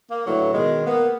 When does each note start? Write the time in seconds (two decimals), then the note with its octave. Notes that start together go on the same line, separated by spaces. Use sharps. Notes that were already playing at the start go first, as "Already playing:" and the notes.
0.11 A#3
0.27 A2 D3 E3 F#3
0.53 B2 D#3 G#3
0.87 A#3 B3